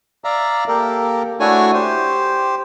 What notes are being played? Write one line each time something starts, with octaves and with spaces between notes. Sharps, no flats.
D5 E5 F5 A#5
A#3 G4 A4 A#4
A3 D4 E4 F#4 C#5 G#5
G4 C5